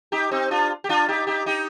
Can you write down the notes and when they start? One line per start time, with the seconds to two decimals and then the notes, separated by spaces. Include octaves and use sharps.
0.12 D#4 G4
0.31 C4 D#4
0.51 D4 F4
0.84 G4
0.89 D4 F4
1.08 D#4 G4
1.27 D#4 G4
1.46 D#4 G4